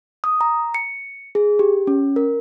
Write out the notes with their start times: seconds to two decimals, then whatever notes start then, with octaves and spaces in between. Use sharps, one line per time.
0.24 D#6
0.41 A#5
0.74 C#7
1.35 G#4
1.59 G4
1.87 C#4
2.16 A#4